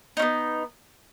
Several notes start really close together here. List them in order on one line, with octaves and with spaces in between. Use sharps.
D#4 C#4 B3